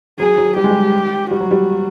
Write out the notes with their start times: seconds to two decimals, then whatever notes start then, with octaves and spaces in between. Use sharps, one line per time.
0.19 F#3 G#4
0.38 F#3
0.56 G3 G4
0.64 G#3
0.71 G3
1.31 G3 F#4
1.41 F#3
1.51 G3